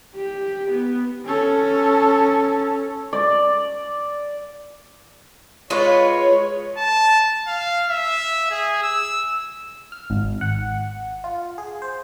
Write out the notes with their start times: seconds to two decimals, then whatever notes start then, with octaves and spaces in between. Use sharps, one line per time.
0.15 G4
0.71 B3
1.26 C#4 A4
3.13 D5
5.70 G#3 F4 B4 C#5
6.77 A5
7.47 F5
7.90 E5
8.51 G#4
8.83 E6
9.92 F6
10.10 G#1
10.41 F#5
11.24 F4
11.58 G#4
11.82 C5